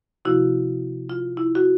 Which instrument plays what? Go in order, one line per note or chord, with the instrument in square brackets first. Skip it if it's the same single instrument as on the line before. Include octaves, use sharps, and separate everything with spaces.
[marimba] C3 F3 A#3 E4 F#4
F4
E4
F#4